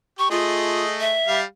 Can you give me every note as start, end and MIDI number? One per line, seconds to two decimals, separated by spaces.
0.19 0.28 67
0.19 0.28 85
0.31 1.14 57
0.31 0.83 65
0.31 1.14 68
0.31 1.14 75
1.00 1.39 76
1.27 1.43 55
1.27 1.43 77